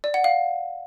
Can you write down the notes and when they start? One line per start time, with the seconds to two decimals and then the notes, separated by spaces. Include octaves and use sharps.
0.04 D5
0.14 F#5
0.24 F5